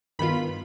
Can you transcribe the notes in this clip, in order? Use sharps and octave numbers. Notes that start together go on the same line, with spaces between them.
G2 D#3 B3 F4 B5